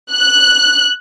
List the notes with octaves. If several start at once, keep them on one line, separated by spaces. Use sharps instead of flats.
F#6